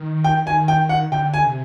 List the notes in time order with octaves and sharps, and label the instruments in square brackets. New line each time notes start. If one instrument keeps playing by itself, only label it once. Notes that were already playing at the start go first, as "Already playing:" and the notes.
Already playing: [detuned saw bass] D#3
[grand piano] G5
[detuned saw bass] D#3 [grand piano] G#5
[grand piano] G5
F#5
[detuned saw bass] D3 [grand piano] G5
[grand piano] G#5
[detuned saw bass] C3